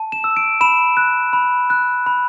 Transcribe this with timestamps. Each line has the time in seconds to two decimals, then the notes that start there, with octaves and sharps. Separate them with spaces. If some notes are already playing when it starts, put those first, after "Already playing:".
Already playing: A5
0.12 E7
0.24 E6
0.37 D7
0.61 B5 E7
0.97 F#6
1.33 B5
1.70 F#6
2.06 B5